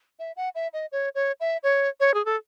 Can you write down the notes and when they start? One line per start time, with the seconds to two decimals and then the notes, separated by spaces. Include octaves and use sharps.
0.19 E5
0.36 F#5
0.55 E5
0.73 D#5
0.92 C#5
1.15 C#5
1.40 E5
1.63 C#5
2.00 C#5
2.14 G#4
2.25 A4